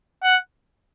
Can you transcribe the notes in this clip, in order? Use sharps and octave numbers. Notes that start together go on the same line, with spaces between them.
F#5